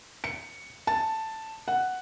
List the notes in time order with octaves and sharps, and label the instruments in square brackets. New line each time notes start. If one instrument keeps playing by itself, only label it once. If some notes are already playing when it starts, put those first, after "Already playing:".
[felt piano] C#7
A5
F#5